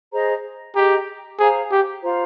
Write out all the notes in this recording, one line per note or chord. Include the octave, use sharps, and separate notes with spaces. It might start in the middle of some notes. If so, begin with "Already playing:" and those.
G#4 C5 D#5 A#5
G4 G#4 D#5 G5 A#5
G#4 C5 F5 A#5
G4
F4 C5 F5 A#5